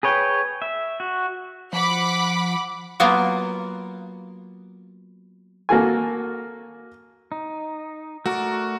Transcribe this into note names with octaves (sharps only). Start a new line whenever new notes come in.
G#4 B4 C#5 G5
E5
F#4
F3 F#5 B5 D6
F#3 A#3 B3 F4
A#3 F#4 A4 G#5
D#4
A3 F#4 A#4 D5